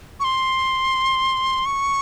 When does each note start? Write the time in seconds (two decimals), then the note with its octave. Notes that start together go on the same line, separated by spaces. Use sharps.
0.20 C#6
0.24 C6
1.66 C#6